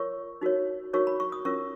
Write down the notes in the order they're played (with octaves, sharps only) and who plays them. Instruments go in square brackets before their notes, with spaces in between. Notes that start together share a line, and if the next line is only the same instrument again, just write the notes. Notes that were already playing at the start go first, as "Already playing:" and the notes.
Already playing: [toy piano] F4 A#4 C#5 C#6
D#4 F#4 A#4 C#5
D#4 F#4 A#4 C#5 C#6
B5
C#6
D#6
C#4 F4 A#4 C#5 C#6